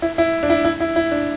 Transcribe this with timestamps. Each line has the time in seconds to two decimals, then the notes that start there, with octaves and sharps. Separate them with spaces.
0.02 E4
0.18 E4
0.43 D4
0.50 E4
0.65 E4
0.80 E4
0.96 E4
1.11 D4